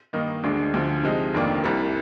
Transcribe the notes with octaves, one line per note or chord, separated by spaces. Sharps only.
G2 D#3 A#3 D#4
D2 D3 G#3 D4
D2 D3 F3
C3 F3 G#3 D#4
F1 F2 D#3 A#3 D4
C2 C3 G3